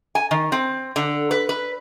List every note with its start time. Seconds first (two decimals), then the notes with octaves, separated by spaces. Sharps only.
0.15 G#5
0.31 D#3
0.52 C4
0.96 D3
1.31 B4
1.49 B4